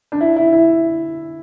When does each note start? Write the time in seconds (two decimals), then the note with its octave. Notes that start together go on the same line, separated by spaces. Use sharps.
0.12 D4
0.21 E4
0.36 E4
0.53 E4